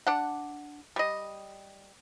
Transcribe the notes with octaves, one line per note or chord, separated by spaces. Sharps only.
D4 F#5
G3 D#5